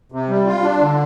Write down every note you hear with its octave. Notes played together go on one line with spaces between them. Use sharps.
C3
G3
F4
D4
D3